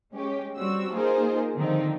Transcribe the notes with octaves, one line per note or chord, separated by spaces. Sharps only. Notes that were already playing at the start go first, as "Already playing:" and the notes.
G#3 C#4 G4
G3 C4 F#4 E6
A#3 D#4 F4 G#4 A#4 C5
D3 D#3 F3 C4 D#4